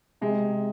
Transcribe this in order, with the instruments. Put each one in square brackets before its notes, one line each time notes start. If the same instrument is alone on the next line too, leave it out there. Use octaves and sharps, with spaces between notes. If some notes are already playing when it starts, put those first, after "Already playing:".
[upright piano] C3 G#3